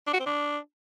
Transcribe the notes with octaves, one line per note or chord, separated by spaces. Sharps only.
D4
F#4
C4
D4